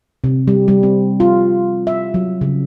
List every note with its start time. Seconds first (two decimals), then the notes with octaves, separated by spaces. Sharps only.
0.24 C3
0.48 G3
0.68 G3
0.83 C4
1.20 F4
1.87 E5
2.14 F#3
2.41 C#3